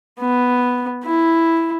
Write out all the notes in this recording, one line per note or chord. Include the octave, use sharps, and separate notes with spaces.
B3
E4